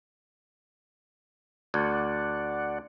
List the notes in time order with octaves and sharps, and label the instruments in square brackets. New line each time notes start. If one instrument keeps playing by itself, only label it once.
[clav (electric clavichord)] D2 [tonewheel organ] D5 F#5